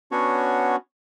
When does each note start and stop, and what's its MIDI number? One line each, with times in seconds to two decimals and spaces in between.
0.11 0.76 59
0.11 0.76 61
0.11 0.76 62
0.11 0.76 66
0.11 0.76 73